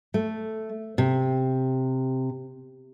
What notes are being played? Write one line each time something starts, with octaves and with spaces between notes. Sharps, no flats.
A3
C3